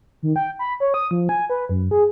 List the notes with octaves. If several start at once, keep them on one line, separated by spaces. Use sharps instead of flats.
D#3
G5
B5
C#5
D#6
F3
G#5
B4
F#2
G#4